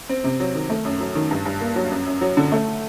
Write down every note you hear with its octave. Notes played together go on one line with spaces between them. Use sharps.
C4
C3
F#3
D#3
A3
F#2
F#3
D#3
G2
G2
A#3
F#3
F#2
F#2
F#3
D3
A3